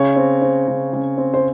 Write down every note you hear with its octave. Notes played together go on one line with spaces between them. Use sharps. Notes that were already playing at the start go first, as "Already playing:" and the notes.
Already playing: C#3 C#5
C4
C4
C#3
C#3
C4
C5